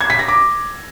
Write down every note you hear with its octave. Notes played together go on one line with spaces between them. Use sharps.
G#6
B6
A#6
D6